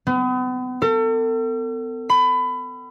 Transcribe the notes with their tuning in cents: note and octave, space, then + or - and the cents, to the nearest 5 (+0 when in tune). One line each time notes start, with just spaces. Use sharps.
B3 +40
A4 +40
B5 +25